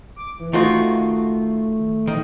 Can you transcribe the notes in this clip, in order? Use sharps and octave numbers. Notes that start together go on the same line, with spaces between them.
D6
E3
D#3 A3 F4 F#4
D#3